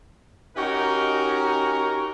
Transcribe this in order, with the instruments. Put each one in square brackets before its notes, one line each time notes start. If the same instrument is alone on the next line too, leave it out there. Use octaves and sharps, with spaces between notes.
[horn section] C#4 D#4 F#4 G4 A#4